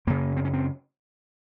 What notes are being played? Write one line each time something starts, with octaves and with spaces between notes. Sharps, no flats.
F#2 C#3 A#3
C4
C#4
C4